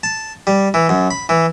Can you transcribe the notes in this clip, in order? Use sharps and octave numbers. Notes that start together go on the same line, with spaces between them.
A5
G3
E3
F#2
B5
E3